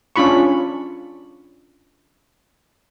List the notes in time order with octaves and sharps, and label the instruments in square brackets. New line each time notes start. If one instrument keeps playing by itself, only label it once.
[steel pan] C#4 D4 F4 B5 C#6